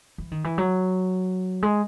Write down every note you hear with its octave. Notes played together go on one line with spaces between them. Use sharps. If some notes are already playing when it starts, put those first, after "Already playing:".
E3
D#3
E3
F#3
G#3